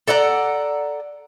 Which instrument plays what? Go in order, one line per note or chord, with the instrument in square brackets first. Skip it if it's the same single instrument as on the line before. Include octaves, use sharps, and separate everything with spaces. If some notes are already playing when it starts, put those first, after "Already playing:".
[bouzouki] A4 D5 F#5 A#5